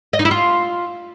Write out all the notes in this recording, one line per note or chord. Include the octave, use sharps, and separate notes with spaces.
D#5
D#4
E4
F4